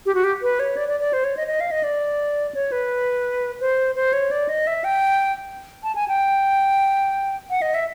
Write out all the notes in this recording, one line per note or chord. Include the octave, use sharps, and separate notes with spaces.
G4
F#4
G4
B4
C#5
D5
D5
D5
C5
C#5
D#5
D#5
F5
D#5
D5
C#5
B4
C5
C5
C#5
D5
D#5
E5
G5
A5
G#5
G5
F#5
D#5
E5